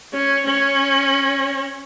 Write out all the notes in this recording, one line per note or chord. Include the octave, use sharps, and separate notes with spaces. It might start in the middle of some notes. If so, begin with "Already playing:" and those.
C#4
C#4